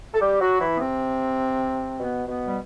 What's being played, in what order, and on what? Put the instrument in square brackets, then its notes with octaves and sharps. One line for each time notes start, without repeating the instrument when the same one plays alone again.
[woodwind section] A4
G3 G4
F#3 F#4
E3 E4
B3
C3 C4
B2 B3
B2 B3
G3